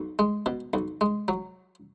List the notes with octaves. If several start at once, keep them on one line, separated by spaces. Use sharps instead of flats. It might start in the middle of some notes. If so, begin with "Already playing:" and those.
Already playing: B1
G#3
B2
B1
G#3
F#3